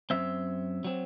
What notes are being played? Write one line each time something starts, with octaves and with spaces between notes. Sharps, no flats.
F#2 F#3 C4 E5
F#3 C4